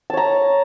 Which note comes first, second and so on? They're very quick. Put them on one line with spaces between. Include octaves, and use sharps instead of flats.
A5 C#5 A#5